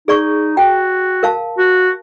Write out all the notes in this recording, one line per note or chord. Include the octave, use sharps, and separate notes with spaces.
D#4 G#4 D5 C#6
F#4 G5
A#4 F5 A5
F#4